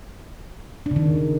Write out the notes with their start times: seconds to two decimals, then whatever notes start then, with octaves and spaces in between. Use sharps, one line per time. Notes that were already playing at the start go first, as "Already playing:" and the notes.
0.86 D4
0.91 C#3
0.96 D#3